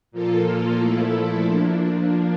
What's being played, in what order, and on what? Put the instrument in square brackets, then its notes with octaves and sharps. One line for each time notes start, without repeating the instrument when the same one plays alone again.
[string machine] A#2 F3 A#3 F4 A4
A#2 F3 A3 E4 A4
F3 A#3 D4